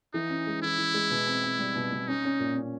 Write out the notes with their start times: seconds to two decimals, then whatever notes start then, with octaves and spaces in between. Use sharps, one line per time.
0.14 E3 D#4
0.30 C#4
0.47 G#3
0.62 E3 E4
0.78 E3
0.94 G#3
1.10 B2
1.27 C4
1.44 C4
1.59 G3
1.76 B2
1.92 B2
2.08 C#4 D#4
2.25 C#4
2.40 A#2
2.56 C#4